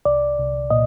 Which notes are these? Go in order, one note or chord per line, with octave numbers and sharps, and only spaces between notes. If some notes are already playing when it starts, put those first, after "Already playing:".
C2 D5
C2
A#2 D#5